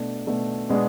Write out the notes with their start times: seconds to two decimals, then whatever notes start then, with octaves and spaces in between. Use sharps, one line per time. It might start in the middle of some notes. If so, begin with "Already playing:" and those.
Already playing: B2 A3 D4
0.27 B2 A3 D4
0.69 B2 G#3 B3 D4